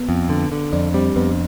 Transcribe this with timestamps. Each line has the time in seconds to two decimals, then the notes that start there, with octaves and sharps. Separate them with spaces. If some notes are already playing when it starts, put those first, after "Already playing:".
Already playing: B3
0.09 F2
0.30 D3
0.52 D3
0.73 F2 D4
0.94 G3 C4
1.16 F2 B3